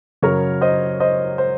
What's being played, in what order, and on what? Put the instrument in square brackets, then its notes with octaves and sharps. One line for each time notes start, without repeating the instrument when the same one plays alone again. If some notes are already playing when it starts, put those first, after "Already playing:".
[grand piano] F#2 C#3 A#4 C#5
C5 D#5
C5 D#5
C5